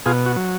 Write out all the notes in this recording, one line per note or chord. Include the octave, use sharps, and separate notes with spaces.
B2 F4 G#4
F#4
F#3